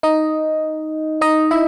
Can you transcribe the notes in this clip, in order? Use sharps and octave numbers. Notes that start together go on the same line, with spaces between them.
D#4 D#5
D#4 D#5
E4 E5